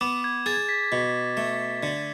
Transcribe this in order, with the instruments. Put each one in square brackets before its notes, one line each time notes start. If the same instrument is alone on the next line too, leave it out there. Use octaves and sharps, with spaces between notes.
[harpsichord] B3 [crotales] D6
[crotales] G#6
[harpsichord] G#4 [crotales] A6
[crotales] B6
[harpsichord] B2
A3
D3